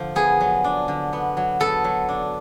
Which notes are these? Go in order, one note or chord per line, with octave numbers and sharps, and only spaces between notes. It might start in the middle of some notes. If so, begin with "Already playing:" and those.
Already playing: D3 F3 F4
B3 G#4
F#3
D4
D3
B3
F#3
B3 A4
F#3
D4